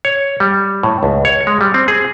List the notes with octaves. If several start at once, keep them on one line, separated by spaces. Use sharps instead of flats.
C#5
G3
A2
C#2
C#5
G#3
G3
C4
G#4